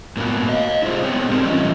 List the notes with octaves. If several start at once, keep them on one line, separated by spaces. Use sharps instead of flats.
A2 A#3 B3 F#4
D#5 F5
E4 F4 G#4 C5
B3 C4 G#4 C#5 G5
C4 D4 D#4 G4 A#4
E3 G3 A3 C#4 F4 D#5